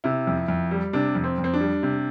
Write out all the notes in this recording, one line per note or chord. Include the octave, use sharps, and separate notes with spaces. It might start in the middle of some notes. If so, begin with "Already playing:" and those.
C3 E4
F2
F2
G3
C3 D4
F2
C4
F2
C4
D4
G3
C3